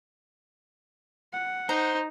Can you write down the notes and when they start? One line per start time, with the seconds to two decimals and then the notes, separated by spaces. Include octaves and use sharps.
1.33 F#5
1.69 D#4 C5 A#5